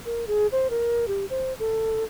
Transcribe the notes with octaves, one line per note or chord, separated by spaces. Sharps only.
A#4
G#4
C5
A#4
G4
C5
A4